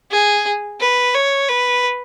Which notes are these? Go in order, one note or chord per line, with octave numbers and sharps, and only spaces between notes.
G#4
B4
C#5
B4